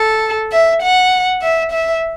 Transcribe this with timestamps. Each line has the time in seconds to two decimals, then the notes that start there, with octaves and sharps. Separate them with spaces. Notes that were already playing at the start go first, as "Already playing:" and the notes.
Already playing: A4
0.52 E5
0.82 F#5
1.42 E5
1.71 E5